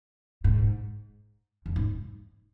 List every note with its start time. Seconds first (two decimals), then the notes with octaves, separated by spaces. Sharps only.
0.44 G#2
1.66 E2
1.76 G#2